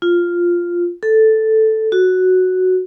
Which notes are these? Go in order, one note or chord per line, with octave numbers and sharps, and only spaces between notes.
F4
A4
F#4